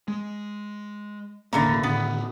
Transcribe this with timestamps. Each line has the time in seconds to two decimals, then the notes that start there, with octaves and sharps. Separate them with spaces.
0.08 G#3
1.53 E1 A1 D#2 D3 E3 A#3
1.83 A2 D3 D#3 B3